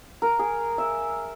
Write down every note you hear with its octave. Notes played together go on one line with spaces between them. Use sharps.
A#4
G#4
E5